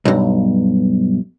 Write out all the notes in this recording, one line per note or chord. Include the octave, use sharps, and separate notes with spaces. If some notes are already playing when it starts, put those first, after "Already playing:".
B1 G2